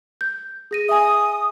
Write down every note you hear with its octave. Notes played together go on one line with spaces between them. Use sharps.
G6
G#4 A#6 D#7
E5 G#5 D#6